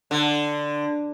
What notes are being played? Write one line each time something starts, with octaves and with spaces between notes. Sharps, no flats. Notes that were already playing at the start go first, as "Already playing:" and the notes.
D3